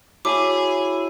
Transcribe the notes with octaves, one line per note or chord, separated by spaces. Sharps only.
E4 F#4 G#4 C#5 E5 A5 D6